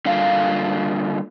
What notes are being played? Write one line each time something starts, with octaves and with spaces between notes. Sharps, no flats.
D3 G3 A#3 F4 A4 F5